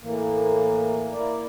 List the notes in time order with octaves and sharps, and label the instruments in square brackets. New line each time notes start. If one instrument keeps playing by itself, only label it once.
[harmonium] A2 E3 A#3
A#3 E4 A#4 D5